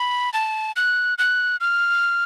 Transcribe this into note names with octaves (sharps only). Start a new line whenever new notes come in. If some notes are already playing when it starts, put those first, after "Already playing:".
Already playing: B5
A5
F#6
F#6
F6